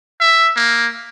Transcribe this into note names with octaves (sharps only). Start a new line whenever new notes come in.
E5
A#3